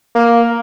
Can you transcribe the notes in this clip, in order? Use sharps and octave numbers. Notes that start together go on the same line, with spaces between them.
A#3